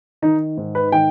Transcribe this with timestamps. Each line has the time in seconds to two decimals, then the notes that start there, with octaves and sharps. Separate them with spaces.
0.22 D#3 D#4
0.57 G#2
0.75 B4
0.92 D#3 G5